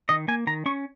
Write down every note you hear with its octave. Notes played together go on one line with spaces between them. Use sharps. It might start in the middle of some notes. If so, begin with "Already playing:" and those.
D#3 D#5
A#3 G#5
D#3 A#5
C#4 C#6